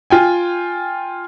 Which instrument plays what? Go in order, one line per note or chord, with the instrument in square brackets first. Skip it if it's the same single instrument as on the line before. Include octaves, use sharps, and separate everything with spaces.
[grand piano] F4 G5 G#5